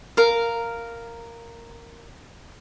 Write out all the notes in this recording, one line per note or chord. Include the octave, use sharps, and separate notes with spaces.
A#4 F5